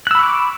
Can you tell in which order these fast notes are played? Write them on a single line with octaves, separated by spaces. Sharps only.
F#6 E6 B5 C#6 D6